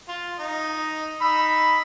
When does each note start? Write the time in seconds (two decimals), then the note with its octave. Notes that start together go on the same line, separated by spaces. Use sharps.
0.08 F4
0.39 D#4 D#5
1.21 D#4 B5 E6